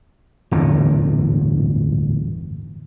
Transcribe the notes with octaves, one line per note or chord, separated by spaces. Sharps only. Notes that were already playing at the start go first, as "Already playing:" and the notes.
D1 G1 E2 A#2